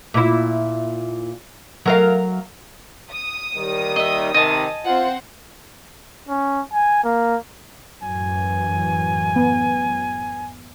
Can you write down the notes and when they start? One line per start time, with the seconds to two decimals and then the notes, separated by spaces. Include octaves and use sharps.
0.14 A#2 E4
1.85 F#3 A#4 F5
3.11 D#6
3.56 D#2 D#3 G3
3.96 D#5 E5
4.34 C3 D#3 D#5 G#5 A5
4.85 C4 F4 C5 F#5
6.29 C#4
6.72 G#5
7.04 A#3
8.03 F#2 A2 E3 G#5
9.36 B3